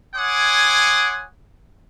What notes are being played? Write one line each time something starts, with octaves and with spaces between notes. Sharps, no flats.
C#5 F#5 G#5 C6 D6 D#6